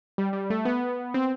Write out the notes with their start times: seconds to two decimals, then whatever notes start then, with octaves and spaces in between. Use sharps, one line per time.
0.18 G3
0.33 G3
0.50 A3
0.65 B3
1.14 C4